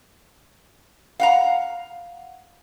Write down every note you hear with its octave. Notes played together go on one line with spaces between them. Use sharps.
F5 F#5 A#5